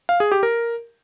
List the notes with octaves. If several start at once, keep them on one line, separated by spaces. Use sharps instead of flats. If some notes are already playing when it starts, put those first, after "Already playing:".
F5
G#4
G4
A#4